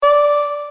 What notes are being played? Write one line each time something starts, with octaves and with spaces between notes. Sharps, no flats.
D5